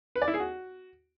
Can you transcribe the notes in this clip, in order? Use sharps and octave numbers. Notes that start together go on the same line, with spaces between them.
B4
D5
E4
G#4
F#4